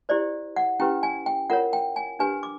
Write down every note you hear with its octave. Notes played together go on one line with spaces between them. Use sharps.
E4 G4 C5 D5
F#5
C#4 E4 G4 B4 G5
G#5
G5
F4 A#4 C#5 F#5
G5
G#5
D4 G4 B4 G#5
D6